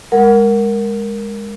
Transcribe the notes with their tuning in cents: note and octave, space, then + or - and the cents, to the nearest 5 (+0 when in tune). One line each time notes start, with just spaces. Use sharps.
G#3 -15 A#4 +0 F#5 +0